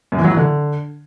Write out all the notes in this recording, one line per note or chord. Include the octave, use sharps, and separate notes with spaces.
F#2
E3
F#3
E3
D3